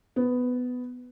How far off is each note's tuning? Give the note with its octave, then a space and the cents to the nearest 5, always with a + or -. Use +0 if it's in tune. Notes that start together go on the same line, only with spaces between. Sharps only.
B3 +10